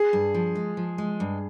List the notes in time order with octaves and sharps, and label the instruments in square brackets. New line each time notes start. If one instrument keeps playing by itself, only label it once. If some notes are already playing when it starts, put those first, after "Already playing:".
Already playing: [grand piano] G#4
[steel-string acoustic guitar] G2
F3
G#3
F3
G#3
G2